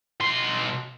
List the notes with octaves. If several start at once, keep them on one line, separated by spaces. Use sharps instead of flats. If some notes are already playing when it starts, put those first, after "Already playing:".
B2 C6